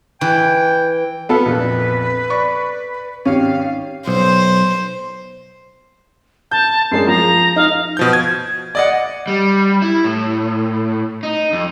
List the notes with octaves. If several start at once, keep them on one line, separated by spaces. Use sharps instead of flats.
E3 G5
B3 A4 B4 F5
A#1 F2 A#2
D5 B5 C#6
G#1 C#4 G4 F5
B1 C5
A5 G6
F#2 G#3 D4 C7
F3 A#5
D#4 F5
B2 F3 G6
G#6
D5 D#5 F#5
G3
E4
A2
D#4
F2